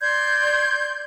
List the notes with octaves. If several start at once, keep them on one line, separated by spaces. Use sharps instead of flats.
D5 C6 G6 G#6